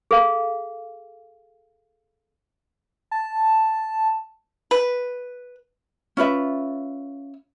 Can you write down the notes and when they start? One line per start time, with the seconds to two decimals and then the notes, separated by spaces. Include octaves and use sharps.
0.11 G#4 A4 F5
3.11 A5
4.71 B4
6.17 C#4 F4 B4 E5